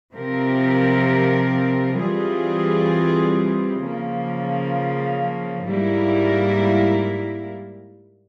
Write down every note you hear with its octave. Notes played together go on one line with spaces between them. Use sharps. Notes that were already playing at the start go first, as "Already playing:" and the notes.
C3 F3 C4 G4 A#4
E3 G3 C4 F4 G#4
C#3 F3 A#3
G#2 G3 A#3 E4 A#4